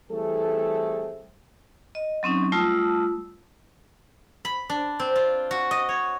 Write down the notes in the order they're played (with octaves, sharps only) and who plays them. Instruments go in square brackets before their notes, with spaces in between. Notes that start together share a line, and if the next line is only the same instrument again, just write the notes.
[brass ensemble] E3 G3 A3 C4 G#4 A4
[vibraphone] D#5
F#3 C4 C#4 D#4
G3 A3 F4 A5 D#6 E6
[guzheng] B5
D4
C4
F4
F#4
D#5
C#5